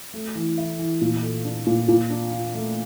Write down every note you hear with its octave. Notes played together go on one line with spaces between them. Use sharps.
A3
E3
E4
E3
A#2
A4
D4
A#2
A#2
D4
F4
A3